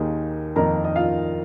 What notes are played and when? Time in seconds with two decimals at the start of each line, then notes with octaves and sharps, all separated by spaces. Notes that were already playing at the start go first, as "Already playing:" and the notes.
Already playing: D#2 D#3 A#3 D#4 G#4
0.56 F2 D#3 A#3 D#4 A#4 A#5
0.84 D#5
0.96 F4 F5